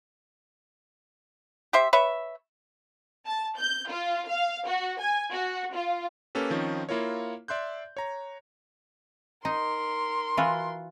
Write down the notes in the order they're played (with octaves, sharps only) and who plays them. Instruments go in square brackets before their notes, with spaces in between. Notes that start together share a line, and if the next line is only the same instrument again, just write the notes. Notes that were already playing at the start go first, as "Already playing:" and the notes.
[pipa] G4 C5 E5
B4 C#5 E5
[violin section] A5
G6
F4
F5
F#4
G#5
F#4
F4
[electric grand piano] A#3 C#4 G4 A4 B4
D#3 F3 C4 C#4 D#4
A#3 E4 F4 A#4 C#5
D5 E5 C6 F#6 G6
C#5 A#5
[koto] D#4 [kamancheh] A#4 C6
[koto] E3 F4 F#4